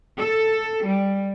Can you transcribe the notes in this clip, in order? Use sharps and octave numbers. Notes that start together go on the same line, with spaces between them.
A4
G3